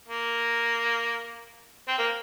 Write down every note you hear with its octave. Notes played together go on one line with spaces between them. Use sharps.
A#3
C4
A#3